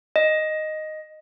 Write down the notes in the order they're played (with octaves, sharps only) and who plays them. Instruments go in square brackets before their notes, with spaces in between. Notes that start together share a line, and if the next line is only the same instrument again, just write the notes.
[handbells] D#5